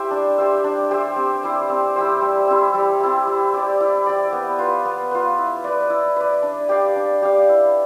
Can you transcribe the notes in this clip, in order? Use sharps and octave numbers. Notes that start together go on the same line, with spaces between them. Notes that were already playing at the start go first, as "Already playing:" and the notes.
Already playing: E4 G4 C5 E5
D4
G4 C5 E5
D4
G4 C5 E5
C4
E4 G4 C5
C4
E4 G4 C5
G3
C4 E4 G4
G3
C4 E4 G4
E4
G4 D5
E4
G4 D5
B3
F4 B4
B3
F4 B4
E4
B4 D5
E4
B4 D5
D4
G4 D5 F5
D4
G4 D5 F5
E4